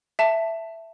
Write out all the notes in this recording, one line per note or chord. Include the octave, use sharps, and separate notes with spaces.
E5 A5